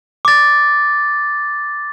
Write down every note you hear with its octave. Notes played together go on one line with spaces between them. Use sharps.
D6 A6